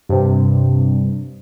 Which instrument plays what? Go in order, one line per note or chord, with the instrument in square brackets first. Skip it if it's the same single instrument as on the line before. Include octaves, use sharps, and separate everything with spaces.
[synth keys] G2 C3